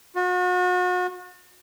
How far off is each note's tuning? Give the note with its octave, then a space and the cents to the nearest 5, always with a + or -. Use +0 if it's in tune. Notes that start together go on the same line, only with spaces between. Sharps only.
F#4 -40